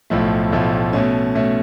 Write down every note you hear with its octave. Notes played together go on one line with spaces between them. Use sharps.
B1 A2 F3 A3
B1 A2 F3 A3
B2 A3 C#4
B2 A3 C#4